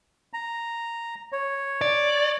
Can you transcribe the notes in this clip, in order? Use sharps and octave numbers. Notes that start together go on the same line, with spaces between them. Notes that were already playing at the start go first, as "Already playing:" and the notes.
A#5
C#5
D5